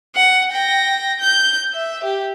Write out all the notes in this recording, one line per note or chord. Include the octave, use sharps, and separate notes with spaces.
F#5
G5 A#6
G6
E5
G4